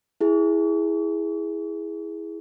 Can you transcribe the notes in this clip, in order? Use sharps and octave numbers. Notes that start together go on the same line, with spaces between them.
E4 G#4